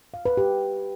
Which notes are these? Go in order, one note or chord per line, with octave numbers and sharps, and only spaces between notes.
F5
B4
G4